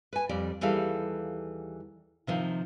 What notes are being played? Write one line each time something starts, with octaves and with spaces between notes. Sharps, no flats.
B4 G#5
F2 G3 D5
D#2 E3 G3 G#4 A4 F5
C3 D#3 F3